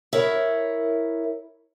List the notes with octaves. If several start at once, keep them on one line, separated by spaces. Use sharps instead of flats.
E4 A#4 C#5